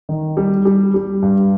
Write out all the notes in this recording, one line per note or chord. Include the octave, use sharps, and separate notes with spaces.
D#3
G3
G3
G3
G2